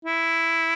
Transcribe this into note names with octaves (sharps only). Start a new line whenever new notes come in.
E4